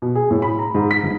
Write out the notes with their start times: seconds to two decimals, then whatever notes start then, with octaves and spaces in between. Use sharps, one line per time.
0.02 B2
0.15 G#4
0.31 A2
0.42 B5
0.59 A#5
0.74 G#2
0.91 B6
1.03 G1